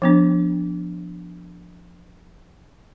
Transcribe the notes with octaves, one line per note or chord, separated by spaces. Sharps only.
F3 B3 D4